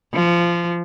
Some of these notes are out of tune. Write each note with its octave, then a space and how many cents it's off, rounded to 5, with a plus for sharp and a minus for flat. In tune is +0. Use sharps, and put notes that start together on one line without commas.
F3 -20